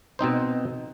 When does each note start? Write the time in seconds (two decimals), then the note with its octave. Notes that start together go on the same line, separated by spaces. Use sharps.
0.19 B2 C4 D#4 C5